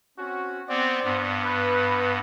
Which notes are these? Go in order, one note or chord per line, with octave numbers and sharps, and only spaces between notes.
C4 C#4 F#4
B3 C4 C5 D5
G2 B3
B4